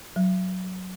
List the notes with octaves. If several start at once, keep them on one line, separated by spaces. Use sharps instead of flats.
F#3